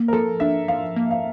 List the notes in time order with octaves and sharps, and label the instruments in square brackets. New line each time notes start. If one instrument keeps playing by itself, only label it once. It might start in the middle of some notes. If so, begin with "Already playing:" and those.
Already playing: [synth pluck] A#3
[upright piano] A#4
[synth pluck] F3 [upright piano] A4
[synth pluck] D4 [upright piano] E5
[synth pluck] F3 [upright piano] F5
[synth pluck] A#3
[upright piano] F5